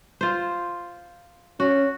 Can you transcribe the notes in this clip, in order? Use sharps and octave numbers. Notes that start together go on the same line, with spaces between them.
F4 C5
C#4 F#4